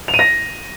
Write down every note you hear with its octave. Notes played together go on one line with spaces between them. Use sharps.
F7
D#7
A#6